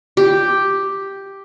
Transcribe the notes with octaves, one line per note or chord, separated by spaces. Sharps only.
G4